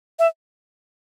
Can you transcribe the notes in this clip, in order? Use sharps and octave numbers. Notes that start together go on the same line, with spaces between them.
E5